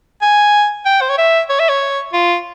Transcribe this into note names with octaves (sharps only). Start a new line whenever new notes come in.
G#5
G5
C5
C#5
E5
C#5
E5
C#5
F4